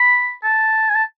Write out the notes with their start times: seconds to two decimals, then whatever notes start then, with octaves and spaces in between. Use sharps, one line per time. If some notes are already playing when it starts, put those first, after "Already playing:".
Already playing: B5
0.44 A5
0.90 G#5
0.95 A5